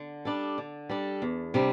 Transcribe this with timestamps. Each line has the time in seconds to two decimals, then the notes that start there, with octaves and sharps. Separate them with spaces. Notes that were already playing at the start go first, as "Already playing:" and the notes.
Already playing: D3
0.25 G3 D4 A4
0.58 D3
0.89 G3 D4 A4
1.22 E2
1.54 C3 G3 D4